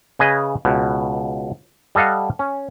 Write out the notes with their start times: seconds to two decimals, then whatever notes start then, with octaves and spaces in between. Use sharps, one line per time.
0.19 C#3 G#4 B4 D#5
0.65 C#2 B2
1.95 G3 A4 D#5 F5 F#5
2.39 C#4